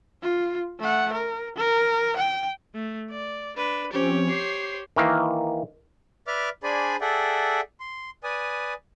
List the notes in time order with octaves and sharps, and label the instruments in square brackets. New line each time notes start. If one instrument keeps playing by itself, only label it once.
[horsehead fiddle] F4
A3 F#5
A#4
A#4
G5
[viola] A3
D5
[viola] D4 [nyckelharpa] B4
[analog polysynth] F3 C4 C#4 [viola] G4 [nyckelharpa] C#5
[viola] G4 C5 [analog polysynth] C7
[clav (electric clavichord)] D#3 E3 A#3
[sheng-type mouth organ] B4 D5 E5 D6 F6
D4 G#4 C5 D5 G#5 B5
G#4 A4 D5 E5 F#5 G5
C6
B4 D5 G#5 D#6